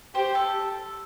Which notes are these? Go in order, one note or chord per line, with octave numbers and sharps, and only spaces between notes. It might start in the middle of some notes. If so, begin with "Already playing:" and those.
G4 C5
A4